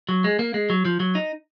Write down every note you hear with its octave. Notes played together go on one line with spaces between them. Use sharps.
F#3
G#3
A#3
G#3
F#3
F3
F#3
D#4